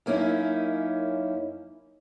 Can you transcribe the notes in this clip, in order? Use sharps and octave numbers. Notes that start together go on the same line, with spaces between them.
F#2 A#3 C#4 D#4 E4